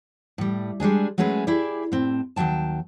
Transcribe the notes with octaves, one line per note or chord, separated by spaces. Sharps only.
A2 G3
G3 G#3 D4 G#4
F#3 G#3 A3 C#4 G#4 B4
E4 G4 G#4 D5
A2 C4
D#2 G#2 F#3 G5 A5